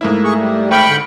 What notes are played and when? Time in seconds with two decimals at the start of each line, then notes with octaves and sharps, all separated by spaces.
0.01 G#2 A3 A#3 E4
0.24 G#4 C#6
0.39 G3
0.71 G#1 G5 B5 C#6 F6
0.89 D3